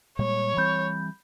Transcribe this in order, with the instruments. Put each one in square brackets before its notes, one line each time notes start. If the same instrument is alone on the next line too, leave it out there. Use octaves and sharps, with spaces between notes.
[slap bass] A#2 G3 G#3 [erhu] C#5
[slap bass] E3 G3 C4 [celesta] B5 G6